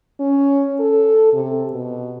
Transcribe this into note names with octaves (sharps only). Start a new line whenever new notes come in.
C#4
A4
C3
B2